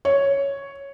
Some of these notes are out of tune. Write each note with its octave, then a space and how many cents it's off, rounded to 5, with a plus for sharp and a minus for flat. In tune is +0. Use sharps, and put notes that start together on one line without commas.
C#5 +0